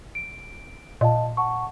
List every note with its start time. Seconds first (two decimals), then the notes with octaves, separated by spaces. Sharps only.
0.15 D7
1.01 A#2 D#5 F5 A5
1.37 F#5 A5 C#6